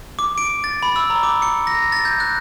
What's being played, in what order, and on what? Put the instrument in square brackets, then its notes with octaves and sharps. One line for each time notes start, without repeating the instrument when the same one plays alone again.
[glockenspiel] D6
D7
A6
B5
E6
A#5
D6
C#7
A#6
A6
G6
F#6